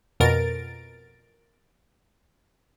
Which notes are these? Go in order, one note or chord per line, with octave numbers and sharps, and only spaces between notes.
F2 B2 A#4 A6 D7